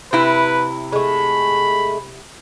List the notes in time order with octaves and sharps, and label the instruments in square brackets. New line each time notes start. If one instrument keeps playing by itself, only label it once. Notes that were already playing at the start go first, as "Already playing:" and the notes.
[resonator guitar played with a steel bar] C3 E4 [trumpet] B4
[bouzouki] G#3 A3 [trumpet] B5